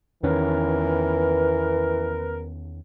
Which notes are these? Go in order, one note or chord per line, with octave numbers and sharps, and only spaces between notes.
E2 D#3 E3 C#4 A#4 B4